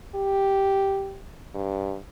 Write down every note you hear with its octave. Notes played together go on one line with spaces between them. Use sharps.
G4
G2